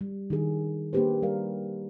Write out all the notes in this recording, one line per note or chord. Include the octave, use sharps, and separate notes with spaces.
G3
D#3 D4 G#4
A#3 D4 D#4 G4 B4 C5
G3 D4 A#4 D5 F5